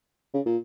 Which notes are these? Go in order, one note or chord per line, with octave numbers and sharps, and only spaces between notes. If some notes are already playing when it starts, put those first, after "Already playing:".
C#3
A#2